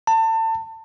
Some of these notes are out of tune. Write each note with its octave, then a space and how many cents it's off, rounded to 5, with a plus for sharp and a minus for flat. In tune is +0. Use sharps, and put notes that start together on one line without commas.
A5 +30